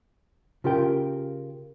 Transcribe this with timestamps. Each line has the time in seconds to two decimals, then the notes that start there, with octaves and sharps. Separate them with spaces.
0.64 C#3 F4 G4 A#4 G5